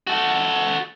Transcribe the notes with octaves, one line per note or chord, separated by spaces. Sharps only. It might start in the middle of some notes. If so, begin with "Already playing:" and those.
F#4 A4